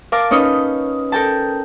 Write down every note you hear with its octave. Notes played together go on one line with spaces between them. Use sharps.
A#4 F5 A5 D6
C#4 D#4 B4 C#5 D#5
A4 A#4 G5 A5